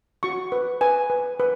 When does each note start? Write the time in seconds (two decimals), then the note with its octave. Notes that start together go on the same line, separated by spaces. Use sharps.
0.23 F#4 C#6
0.52 B4
0.81 B4 G#5
1.10 B4
1.40 B4